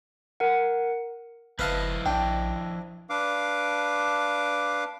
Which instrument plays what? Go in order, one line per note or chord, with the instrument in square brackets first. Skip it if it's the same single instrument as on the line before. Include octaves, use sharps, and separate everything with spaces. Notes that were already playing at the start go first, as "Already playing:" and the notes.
[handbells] A#4 F#5
[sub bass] F#1 [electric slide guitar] F3 E4 D#5 [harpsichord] B4 F5 A5
[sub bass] A#1 [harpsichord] D4 [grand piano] G5
[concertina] D4 B4 F5 D6